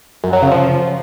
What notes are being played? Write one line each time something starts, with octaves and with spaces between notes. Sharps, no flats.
F#2
F#3
C#3
F3